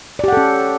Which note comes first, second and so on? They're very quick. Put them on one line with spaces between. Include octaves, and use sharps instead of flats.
D5 G4 F#5 A4 C#4